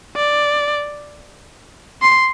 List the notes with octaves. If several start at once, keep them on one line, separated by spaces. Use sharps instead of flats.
D5
C6